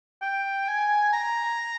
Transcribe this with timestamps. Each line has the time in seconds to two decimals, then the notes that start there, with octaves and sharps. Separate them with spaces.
0.22 G5
0.68 G#5
1.13 A#5